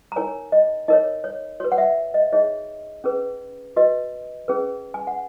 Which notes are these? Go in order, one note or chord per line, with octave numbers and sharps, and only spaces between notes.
A#5
D#4 A#4 C#5 G#5
D#5
D#4 A#4 C#5 D#5
C#5
F#4 B4 C#5
F#5
E5
D#5
D#4 G#4 C#5 D#5
C#4 G#4 B4
F#4 B4 D#5
C#4 G#4 B4
G#5
F#5